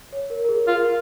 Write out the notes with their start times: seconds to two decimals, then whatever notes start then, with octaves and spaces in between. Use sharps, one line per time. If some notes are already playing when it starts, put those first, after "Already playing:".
0.13 C#5
0.30 A#4
0.45 A#4
0.49 G#4
0.67 F4 A#4